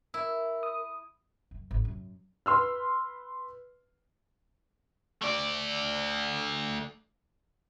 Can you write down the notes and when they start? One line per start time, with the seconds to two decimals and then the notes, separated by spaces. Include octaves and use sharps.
0.14 E4 A#4 E6
0.63 D#6
1.51 F#2
1.71 G#1
1.85 F#2
2.46 B4 C6 E6 F6
5.22 A3 D5